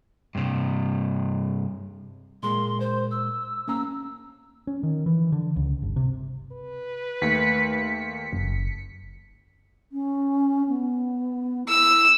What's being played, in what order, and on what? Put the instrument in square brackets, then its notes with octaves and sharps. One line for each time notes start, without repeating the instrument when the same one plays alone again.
[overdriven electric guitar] G2 C3
[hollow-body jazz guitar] A#2 G#3 A#3 [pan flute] C6
[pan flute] C5
E6
[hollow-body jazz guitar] A#3 C#4 A#5 [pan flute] E6
[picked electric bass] C#4
D#3
E3
D3
C#2
G1
C3
[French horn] B4
[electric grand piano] D#2 A3 [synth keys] B6 C#7
[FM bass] F#1
[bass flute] C#4
B3
[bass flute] E4 [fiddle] E6